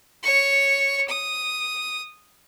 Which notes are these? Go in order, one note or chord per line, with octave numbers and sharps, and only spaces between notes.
C#5 C#6
D#6